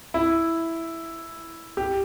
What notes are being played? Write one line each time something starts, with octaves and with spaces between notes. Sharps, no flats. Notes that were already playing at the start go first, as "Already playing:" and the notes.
E4
G4